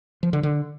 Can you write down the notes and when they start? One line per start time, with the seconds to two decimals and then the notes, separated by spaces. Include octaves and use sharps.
0.23 F3
0.33 D3
0.43 D3